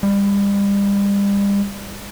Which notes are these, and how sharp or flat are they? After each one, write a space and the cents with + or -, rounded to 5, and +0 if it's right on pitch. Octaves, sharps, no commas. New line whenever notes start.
G3 +35